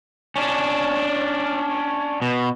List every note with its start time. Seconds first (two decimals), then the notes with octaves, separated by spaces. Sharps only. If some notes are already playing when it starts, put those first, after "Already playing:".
0.36 C#4 D4
2.22 B2